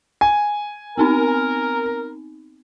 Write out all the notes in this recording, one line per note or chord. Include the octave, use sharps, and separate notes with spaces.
G#5
B3 C4 D#4 A#4